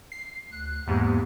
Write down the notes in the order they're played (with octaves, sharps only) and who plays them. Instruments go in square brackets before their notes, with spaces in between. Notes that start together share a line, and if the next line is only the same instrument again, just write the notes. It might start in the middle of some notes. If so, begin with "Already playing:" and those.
[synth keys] C7
[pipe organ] D2 F#6
[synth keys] E2 G#2 [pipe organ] A#3 B3 G4